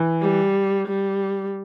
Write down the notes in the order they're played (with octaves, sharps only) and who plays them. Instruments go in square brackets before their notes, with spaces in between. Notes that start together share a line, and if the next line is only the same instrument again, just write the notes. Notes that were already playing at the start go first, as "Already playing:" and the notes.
Already playing: [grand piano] E3
[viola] G3
G3